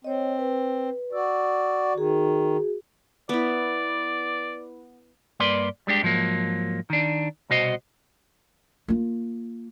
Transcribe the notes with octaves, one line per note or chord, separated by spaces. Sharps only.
C4 C#5 D#5
B4
F#4 D5 E6
D#3 F#4 G#4
B3 E4 D5
G2 A#3 B4 D5 C6
G3 G#3 D4 G4
G#2 F3 F#3 A#3
D#3 D4
C2 B2 F#4 C5 D#5
A#3 F4